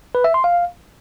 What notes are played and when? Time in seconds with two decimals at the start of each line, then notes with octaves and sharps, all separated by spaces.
0.15 B4
0.24 E5
0.34 C6
0.44 F5